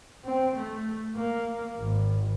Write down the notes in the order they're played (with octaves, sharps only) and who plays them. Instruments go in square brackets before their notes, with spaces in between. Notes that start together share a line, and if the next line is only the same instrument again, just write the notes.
[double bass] C4
A3
A#3
G#1